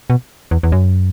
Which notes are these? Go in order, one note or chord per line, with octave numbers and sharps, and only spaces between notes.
B2
E2
E2
F#2